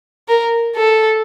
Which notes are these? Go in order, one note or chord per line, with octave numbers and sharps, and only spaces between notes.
A#4
A4